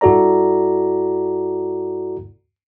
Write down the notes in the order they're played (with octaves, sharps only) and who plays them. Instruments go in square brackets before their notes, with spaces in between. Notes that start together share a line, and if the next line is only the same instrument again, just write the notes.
[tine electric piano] G2 E4 F#4 A4 D5 A#5